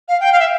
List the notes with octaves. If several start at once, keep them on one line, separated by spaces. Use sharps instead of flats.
F5
G5
F5
E5